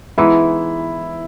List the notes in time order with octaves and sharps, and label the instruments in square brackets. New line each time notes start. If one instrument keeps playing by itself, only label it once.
[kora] E3 G#3 B3 D#4 [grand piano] E4